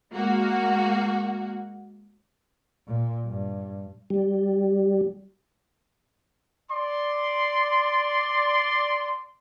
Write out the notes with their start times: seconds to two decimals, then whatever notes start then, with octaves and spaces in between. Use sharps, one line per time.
0.14 G#3 A#3 F#4
2.87 A#2
3.26 G2
4.10 G3
6.71 D5 C6